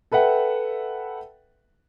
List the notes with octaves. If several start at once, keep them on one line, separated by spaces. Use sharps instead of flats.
A4 B4 E5 F#5 G5